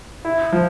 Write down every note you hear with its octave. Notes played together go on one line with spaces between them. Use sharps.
E4
F3